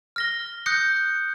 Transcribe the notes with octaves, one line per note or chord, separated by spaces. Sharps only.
F6 A#6 G7
D#6 F#6 G6 A#6 C#7